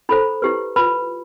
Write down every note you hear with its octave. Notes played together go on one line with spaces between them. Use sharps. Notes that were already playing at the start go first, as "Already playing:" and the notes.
E4 A4 C5 B5
E4 G4 B4
F4 B4 B5